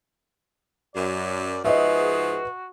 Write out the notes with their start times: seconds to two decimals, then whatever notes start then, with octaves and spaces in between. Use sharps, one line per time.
0.95 F#2 D5
1.65 G#2 F3 F#4 G#4 B4 D#5 E5